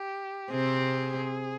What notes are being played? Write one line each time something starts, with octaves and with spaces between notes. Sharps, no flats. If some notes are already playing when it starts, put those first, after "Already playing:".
Already playing: G4
C3 C4 G#4